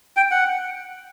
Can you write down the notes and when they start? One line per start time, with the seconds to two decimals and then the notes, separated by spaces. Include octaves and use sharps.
0.17 G5
0.31 F#5